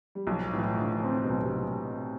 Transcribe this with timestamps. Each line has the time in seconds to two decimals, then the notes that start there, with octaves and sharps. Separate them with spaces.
0.15 G3
0.27 B1 F3
0.53 A2 E3
0.78 D3 F3
1.04 C4
1.24 B2
1.30 B1
1.42 C3